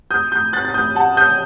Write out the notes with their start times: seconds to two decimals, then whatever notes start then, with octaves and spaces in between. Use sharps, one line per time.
0.11 D#6 G6
0.32 D#6 G6
0.53 F#6 A6
0.65 A6
0.74 D#6 G6
0.96 F#5 A5
1.17 D#6 G6